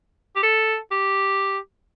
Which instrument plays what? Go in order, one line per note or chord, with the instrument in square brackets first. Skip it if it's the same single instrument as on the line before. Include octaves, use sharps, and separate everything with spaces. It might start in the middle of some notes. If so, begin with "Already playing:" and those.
[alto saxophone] G4
A4
G4